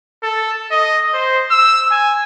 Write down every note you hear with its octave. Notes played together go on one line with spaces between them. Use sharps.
A4
D#5
C5
E6
G#5